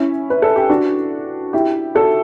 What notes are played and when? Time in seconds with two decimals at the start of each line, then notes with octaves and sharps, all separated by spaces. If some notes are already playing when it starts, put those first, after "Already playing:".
Already playing: C#4 E4
0.30 B4
0.42 A4
0.56 G4
0.69 D4 F#4
1.53 E4 G4
1.95 F#4 A4